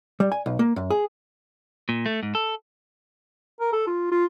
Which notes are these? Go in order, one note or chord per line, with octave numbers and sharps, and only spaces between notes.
G3
G#5
B1
A#3
F#2
G#4
A#2
A3
G#2
A4
A#4
A4
F4
F4